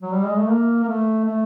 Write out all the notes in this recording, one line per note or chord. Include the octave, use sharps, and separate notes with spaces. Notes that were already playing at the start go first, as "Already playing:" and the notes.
F#3
G3
G#3
A3
A#3
A#3
A3
A3